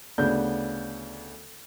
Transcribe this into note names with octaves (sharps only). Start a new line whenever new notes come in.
D2 C#3 B3 D4 G6